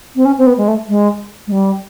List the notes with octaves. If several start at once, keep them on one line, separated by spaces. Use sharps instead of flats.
C4
C#4
C4
B3
G#3
A3
G#3
G#3
G3